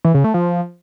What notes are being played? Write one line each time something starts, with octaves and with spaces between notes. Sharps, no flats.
E3
C#3
A3
F3